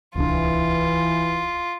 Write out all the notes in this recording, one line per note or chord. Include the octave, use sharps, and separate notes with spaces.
D1 C2 E3 D4 F4